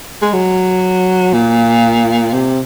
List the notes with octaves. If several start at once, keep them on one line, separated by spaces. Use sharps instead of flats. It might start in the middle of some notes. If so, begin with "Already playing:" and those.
G#3
F#3
A#2
C3